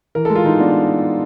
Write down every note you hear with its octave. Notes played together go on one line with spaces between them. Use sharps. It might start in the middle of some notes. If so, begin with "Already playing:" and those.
E3 A#4
G#3 A4
F4
E3 D#4
B3 D4